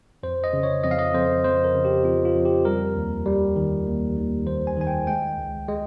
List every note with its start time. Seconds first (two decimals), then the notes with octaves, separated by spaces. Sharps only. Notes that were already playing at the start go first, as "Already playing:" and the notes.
0.23 F2 C5
0.44 D#5
0.53 C#3
0.63 C#5
0.83 F2 D#5
0.91 F5
0.99 D#5
1.14 F2 C5
1.44 F2 C5
1.64 A#4
1.75 C#3
1.85 G4
2.05 F2 F4
2.25 F4
2.35 F2
2.45 G4
2.65 G3 A#4
2.96 D#2
3.26 G3
3.56 D#3
3.87 D#2
4.17 D#2
4.47 D#2 C5
4.67 G#5
4.77 D#3 G#5
4.87 G5
5.07 G#3 G5
5.38 C#2
5.68 G#3